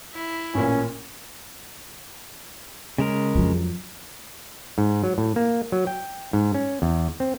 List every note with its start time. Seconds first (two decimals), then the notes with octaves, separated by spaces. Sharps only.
0.14 E4
0.54 A1 A#2 C#4
2.98 C#3 G#3 A#4
3.34 F2 F#3
4.78 G#2
5.04 F#3
5.18 A2
5.36 A#3
5.72 F#3
5.87 G5
6.33 G#2
6.54 C#4
6.82 E2
7.20 C4